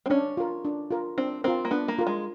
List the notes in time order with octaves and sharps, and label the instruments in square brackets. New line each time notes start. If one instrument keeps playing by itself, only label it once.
[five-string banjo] C4
[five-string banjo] C#4 [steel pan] D4
[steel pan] F4 A#4
D4
F4 A#4
[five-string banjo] C4 [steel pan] D4
[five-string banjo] C4 [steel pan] F4 A#4
[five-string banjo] A#3
[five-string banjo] B3 [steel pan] D4
[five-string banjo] A#3
[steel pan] F4 A#4
[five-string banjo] G#3